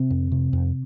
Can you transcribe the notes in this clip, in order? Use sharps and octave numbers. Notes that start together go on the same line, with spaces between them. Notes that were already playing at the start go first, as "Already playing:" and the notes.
Already playing: C3 C4
F2
C3
F2